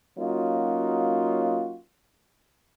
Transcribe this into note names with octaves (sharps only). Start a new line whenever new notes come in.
F#3 A#3 C#4 D#4 F4 F#4